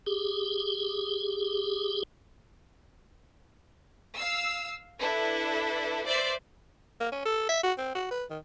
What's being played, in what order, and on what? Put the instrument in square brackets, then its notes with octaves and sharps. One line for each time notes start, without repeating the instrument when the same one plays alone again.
[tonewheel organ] G4 G#4
[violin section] F5 E6
D4 E4 A4 B4
B4 C5 D5 E5
[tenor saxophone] A#3
C#4
A4
E5
F#4
C4
F#4
B4
D#3